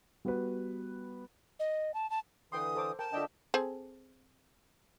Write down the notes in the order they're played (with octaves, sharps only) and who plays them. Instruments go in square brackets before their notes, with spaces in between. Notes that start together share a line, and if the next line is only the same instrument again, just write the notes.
[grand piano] G3 B3 F#4 G4 B4
[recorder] D#5
A5
A5
[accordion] D3 E3 [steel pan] B4 G5 C6 [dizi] D#6
[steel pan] A4 C5 D6
[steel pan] A#4 G5 [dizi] A5
[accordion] D3 D4 D#5 [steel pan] F4 E5 G5
[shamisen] C4 G#4 A4